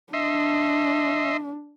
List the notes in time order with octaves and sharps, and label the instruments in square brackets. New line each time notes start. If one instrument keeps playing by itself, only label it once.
[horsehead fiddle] D4 [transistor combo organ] D#5 E5 C6